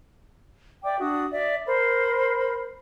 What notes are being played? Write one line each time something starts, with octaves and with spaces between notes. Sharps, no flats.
D5 E5 G5 D6
D4 F#4 D#6
D5 E5
A#4 C5 B5